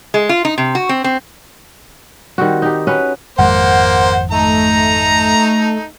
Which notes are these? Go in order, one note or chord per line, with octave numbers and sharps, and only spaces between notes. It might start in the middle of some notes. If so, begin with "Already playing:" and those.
G#3
F4
D#4
C3
F#4
C4
C4
D#3 G3 C4 F#4
D#4 G4
C#4 F#4 B4
G#1 F2 G#3 A#3 C5 F#5
A3 D#4 A#5